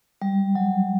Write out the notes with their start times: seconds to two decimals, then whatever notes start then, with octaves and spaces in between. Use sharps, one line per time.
0.22 G3
0.55 F#3